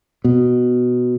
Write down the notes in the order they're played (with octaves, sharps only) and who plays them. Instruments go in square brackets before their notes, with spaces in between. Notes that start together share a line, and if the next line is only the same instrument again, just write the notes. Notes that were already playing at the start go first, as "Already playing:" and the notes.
[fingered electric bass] B2